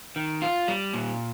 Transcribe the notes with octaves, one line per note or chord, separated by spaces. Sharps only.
D#3
F4
G3
A#2